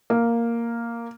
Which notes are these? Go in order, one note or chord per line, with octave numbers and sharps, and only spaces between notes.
A#3